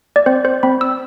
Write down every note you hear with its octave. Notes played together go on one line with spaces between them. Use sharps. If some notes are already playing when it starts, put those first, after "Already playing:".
D5
C4 C5
C5
C4 B5
E6